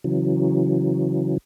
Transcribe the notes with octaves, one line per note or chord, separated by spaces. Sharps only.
C#3 E3 F#3